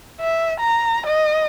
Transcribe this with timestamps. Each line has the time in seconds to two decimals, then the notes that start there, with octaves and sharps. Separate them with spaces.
0.20 E5
0.60 A#5
1.06 D#5